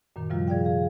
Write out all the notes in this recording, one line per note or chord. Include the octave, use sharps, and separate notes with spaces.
F#2 A#2 D#3
C3 D#3 F3 G3 F4
G#4 D5 F5 G5
G#4 F5